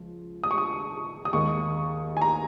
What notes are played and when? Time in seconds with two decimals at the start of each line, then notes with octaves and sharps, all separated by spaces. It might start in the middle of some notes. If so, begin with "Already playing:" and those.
Already playing: C#2 F3
0.43 D#6
0.51 C#6
0.58 D#6
1.25 D#6
1.33 D#2 D#3 G#3 C#6
2.17 G#5
2.22 A#5